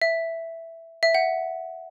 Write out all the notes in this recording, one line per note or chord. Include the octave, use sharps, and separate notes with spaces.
E5
E5
F#5